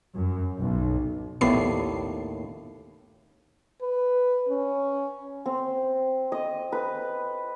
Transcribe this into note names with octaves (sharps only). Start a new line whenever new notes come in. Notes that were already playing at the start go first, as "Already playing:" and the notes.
F#2
B1
A#1 D#2 A2 B3 D5 C7
B4
C#4
C4
D#5
B4